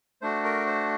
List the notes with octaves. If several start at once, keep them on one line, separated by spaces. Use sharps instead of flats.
A3 D4 F#4 C5
A#4
C5